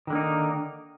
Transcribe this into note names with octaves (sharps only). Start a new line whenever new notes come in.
D3 D#3 A#3 D#4